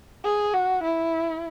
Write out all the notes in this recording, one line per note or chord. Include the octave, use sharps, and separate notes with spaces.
G#4
F#4
E4